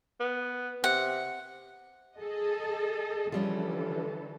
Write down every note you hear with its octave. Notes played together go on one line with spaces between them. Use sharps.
B3
C3 F#5
G#4 A4 D#5
D3 E3 F3 G3 C#4 A4